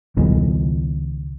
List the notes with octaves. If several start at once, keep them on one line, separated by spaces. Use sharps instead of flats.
C#2 B2 D#3